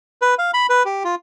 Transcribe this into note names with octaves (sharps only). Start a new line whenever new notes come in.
B4
F5
B5
B4
G4
F4